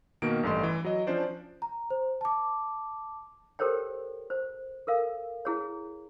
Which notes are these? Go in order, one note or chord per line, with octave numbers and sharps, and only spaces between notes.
B2 D#3 A#3 A#4 D7
A1 G2 A3 D#5 C6
E3
F#3 D#5
F3 C#4 D4 C5 D5
A#5
C5
A5 D6
G4 A4 A#4 C5 C#5 G5
C5
A4 A#4 F5
E4 G#4 C#5